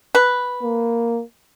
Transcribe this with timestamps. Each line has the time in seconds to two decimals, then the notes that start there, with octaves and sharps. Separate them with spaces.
0.15 B4
0.63 A#3